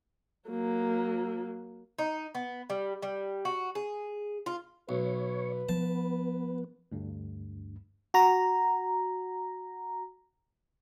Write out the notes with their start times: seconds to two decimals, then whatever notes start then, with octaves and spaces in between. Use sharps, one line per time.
0.49 F#3 A#3
1.98 D#4
2.35 B3
2.70 G3
3.02 G3
3.45 F#4
3.75 G#4
4.46 F4
4.89 B1 B4 C#5
5.69 F3 B3 A5
6.92 D2 G2
8.14 F#4 A#5